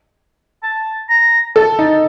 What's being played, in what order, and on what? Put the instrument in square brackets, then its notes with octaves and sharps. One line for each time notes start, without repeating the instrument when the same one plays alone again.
[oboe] A5
A#5
[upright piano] A4 [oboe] A5
[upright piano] D#4